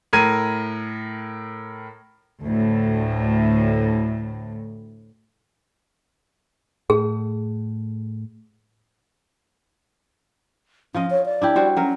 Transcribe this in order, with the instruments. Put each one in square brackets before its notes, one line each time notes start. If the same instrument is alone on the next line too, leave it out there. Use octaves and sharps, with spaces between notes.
[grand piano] A2 A#4 G#6 D#7
[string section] D2 A2
[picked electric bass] A2 [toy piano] G#4
[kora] F3 F4 D#5 [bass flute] C#4
[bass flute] C#5
D5
[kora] D4 E4 G4
G3 F#4 C5
[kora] F#3 A#4 [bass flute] C#4